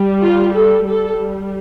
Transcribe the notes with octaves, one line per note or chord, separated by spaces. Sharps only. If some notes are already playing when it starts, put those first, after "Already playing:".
Already playing: G3
F4
A4
G3 A4